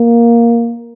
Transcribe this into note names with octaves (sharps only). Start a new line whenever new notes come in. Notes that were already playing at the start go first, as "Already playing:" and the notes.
Already playing: A#3